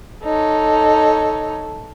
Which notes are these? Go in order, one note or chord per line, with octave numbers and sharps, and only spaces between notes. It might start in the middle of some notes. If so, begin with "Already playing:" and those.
D#4 A4 C#5